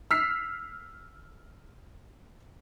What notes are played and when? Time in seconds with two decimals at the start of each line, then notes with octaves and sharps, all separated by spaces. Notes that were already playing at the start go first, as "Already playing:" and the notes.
0.11 E6 F6 B6 C7